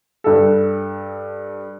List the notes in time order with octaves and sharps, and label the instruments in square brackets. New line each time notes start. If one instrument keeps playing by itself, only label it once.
[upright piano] G2 A4